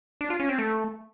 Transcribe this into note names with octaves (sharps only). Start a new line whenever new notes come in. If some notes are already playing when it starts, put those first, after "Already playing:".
D4
F4
C#4
C4
A3